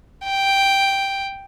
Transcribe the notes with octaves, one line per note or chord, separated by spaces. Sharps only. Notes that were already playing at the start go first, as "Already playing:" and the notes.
G5